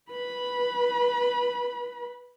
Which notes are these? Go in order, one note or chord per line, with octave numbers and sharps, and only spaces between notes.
B4 B5